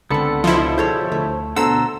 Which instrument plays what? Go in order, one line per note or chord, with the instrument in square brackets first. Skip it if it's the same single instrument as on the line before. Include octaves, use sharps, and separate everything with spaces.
[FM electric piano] C#2 A5 C#7 [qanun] D3 C4 [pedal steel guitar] B3 A4 B5
[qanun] B2 [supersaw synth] F3 E4 [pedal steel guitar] D#5 C6
[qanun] G#4 A4 C#5 [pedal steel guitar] C5
[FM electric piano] D2 [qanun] A3
[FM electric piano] B2 D3 [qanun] A4 C5 [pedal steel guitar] F#5 A#5 [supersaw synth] E6